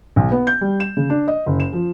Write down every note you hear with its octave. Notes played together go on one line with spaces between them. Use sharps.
B1
B3
G6
G3
E7
C#3
D4
D#5
F#1
E7
F3